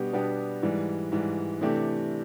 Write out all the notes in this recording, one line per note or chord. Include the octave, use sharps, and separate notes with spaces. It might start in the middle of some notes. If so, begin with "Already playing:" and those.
Already playing: B2 G3 B3 D4 G4
B2 G3 B3 D4 G4
G#2 E3 G3
G#2 E3 G3
C3 E3 A3 D4 G4